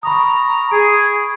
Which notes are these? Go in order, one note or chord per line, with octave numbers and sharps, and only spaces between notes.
A#5 B5 C#6 D#6
G#4 D7